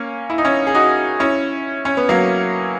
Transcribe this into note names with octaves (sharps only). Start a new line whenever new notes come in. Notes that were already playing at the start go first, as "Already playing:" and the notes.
Already playing: A#3 C#4
E4
D#4
C#4 E4
G#4
D#4 F#4
C#4 E4
C#4
B3
F#3 A#3